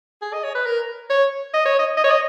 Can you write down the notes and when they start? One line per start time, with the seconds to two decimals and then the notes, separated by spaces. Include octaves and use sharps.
0.22 G#4
0.33 D#5
0.44 C#5
0.55 B4
0.66 A#4
1.10 C#5
1.54 D#5
1.66 C#5
1.79 D#5
1.97 D#5
2.04 C#5
2.10 D#5